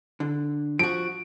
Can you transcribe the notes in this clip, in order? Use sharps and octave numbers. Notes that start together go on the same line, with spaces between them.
D3
F3 F#4 D7